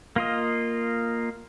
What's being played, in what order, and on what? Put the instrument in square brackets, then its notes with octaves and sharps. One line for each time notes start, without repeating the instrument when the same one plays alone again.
[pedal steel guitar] A#3 F4 D#5